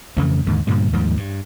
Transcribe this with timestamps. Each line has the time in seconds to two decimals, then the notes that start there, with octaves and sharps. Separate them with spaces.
0.17 F2 C#3 E3 A3
0.47 D#2 G#2 D3
0.67 G2 A#2 D3 G3
0.93 D#2 G#2 F3 G3
1.17 G2